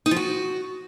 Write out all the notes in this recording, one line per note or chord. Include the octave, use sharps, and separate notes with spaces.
D#4
F3
F#4